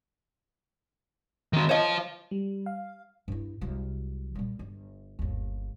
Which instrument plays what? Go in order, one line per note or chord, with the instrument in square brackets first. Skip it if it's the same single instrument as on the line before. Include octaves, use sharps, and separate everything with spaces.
[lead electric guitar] D#3 C4
[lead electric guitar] C5 F5 [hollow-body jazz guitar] C#5 D#5
[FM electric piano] G3
F5
[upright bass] G2 E4
C2 F#3
A#2 G3
G1
G1 D#2